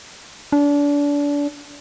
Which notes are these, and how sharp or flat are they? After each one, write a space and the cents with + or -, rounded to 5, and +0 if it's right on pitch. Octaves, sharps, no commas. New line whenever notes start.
D4 -30